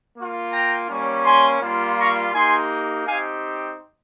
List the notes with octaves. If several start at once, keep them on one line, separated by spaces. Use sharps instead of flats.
A#3 F4
G5 A#5
G3 A#3 C#4
G#5 C6
G3 A#3 F4
A#5 C#6
A#3 D#4 G4 G#5 C6
C4 D#4 G4 F5 G#5